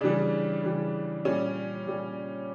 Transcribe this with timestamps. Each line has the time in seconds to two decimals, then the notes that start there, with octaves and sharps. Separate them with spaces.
0.01 C#3 E3 G3 D4
0.63 C#3 E3 G3
1.25 A#2 G3 C#4
1.87 A#2 G3